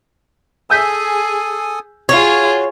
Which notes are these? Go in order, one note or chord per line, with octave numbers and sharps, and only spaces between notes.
G#4 A4 G#5 D#6 E6 G6 B6
F4 F#4 G#4 C#5 F5 C#6 C7